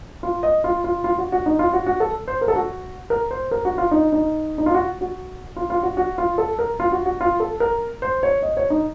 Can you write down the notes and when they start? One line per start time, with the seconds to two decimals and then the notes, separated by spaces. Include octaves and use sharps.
0.23 F4
0.43 D#5
0.64 F4
0.84 F4
1.04 F4
1.18 F#4
1.32 F#4
1.46 D#4
1.59 F4
1.73 F#4
1.87 F#4
2.00 A4
2.28 C5
2.41 A#4
2.48 A4
2.56 F#4
3.10 A#4
3.31 C5
3.51 A#4
3.65 F#4
3.78 F4
3.91 D#4
4.12 D#4
4.58 D#4
4.66 F4
4.74 F#4
5.01 F#4
5.56 F4
5.70 F4
5.83 F#4
5.97 F#4
6.18 F4
6.38 A4
6.59 A#4
6.80 F4
6.92 F#4
7.06 F#4
7.21 F4
7.40 A4
7.60 A#4
8.02 C5
8.23 C#5
8.42 D#5
8.57 C#5
8.70 D#4